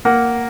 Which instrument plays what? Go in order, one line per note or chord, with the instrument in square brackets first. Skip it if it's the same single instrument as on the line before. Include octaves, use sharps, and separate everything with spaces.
[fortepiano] A#3 [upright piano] F#5